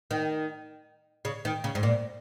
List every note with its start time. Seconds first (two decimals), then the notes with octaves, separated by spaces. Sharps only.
0.11 D#3
1.25 C#3
1.45 D#3
1.64 C#3
1.75 G#2
1.83 A#2